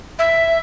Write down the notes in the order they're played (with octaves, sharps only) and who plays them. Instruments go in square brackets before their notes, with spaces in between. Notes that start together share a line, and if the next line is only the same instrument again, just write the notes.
[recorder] E5